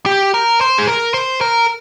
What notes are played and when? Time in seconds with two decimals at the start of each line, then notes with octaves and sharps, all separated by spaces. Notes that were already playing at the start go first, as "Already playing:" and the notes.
0.06 G4
0.34 A#4
0.61 C5
0.78 G#4
0.87 A#4
1.14 C5
1.41 A#4